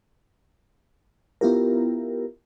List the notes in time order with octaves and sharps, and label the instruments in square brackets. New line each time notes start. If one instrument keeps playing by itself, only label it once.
[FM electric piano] B3 E4 F4 G4 A#4